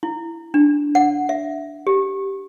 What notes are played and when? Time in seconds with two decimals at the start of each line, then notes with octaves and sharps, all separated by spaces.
0.03 E4
0.54 D4
0.95 F#5
1.29 E5
1.87 G4